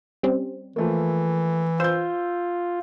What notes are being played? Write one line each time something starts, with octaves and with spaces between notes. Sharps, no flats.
G3 C4 C#4
E3 F3 A3 A#3
F4 C5 E6 G6